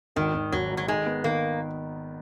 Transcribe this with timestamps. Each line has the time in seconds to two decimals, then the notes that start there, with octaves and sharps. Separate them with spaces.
0.16 G#1 D#3
0.34 G#1
0.52 G#1 F#3
0.71 G#2
0.77 F#3
0.88 D#3 G#3
1.06 B3
1.24 D#3 A#3